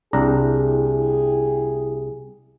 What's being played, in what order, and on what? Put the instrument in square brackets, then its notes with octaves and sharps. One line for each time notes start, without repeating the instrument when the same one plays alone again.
[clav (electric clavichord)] C2 D4 A#5 [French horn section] E4 G4 G#4